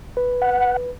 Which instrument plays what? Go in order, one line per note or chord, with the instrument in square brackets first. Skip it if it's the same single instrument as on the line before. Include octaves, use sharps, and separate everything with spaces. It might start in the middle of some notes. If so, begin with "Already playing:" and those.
[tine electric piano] B4
[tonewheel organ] F#5